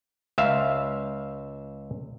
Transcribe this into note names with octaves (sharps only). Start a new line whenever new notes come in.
C#2 E5 F5